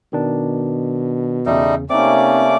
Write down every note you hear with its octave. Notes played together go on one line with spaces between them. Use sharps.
B2 D#3 D4
E2 C#3 G3 A3 D#4
C3 A3 A#3 C4 C#4 D#4 D5 D6